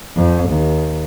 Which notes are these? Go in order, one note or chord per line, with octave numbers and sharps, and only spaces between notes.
F2
D#2